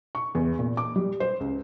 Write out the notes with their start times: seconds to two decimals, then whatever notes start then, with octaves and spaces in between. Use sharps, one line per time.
0.15 C#6
0.35 E2
0.59 A#2
0.77 D6
0.96 G3
1.20 C5
1.40 C#2